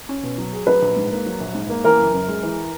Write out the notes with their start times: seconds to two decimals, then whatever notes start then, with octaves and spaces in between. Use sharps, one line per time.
0.09 C#4
0.23 B2
0.38 F#3
0.53 G#4
0.67 F#3 B4
0.82 A#1
0.96 G#2
1.11 A#3
1.26 F#3
1.40 A#1
1.55 G#2
1.69 A#3
1.84 E3 A#4
1.99 F#1
2.14 F#2
2.28 G#3
2.43 E3